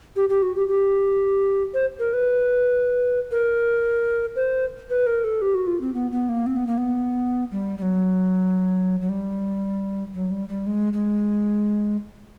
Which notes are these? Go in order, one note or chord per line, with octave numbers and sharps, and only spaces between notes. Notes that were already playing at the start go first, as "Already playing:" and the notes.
G4
G4
F#4
G4
G4
C5
A#4
B4
A#4
C5
B4
A#4
A4
G4
F#4
F4
C4
B3
B3
A#3
C4
B3
A#3
B3
G3
G3
F#3
F#3
G3
F#3
G3
G3
G#3
G#3